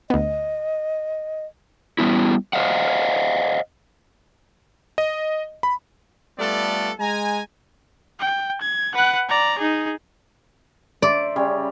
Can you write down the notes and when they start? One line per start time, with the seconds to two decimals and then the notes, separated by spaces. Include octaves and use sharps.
0.10 D2 B3 D#5
1.98 G3 B3 E4
2.53 C5 D#5 F5 F#5
4.98 D#5
5.63 B5
6.38 G3 A3 B3 F4 A4 D5
6.99 G#3 G#5 A#5
8.19 G5
8.61 G#6
8.94 B4 F#5
9.29 D5 A#5
9.58 D#4 G#4
11.02 C5 D5 E5 A#5
11.36 C#3 G3 C#5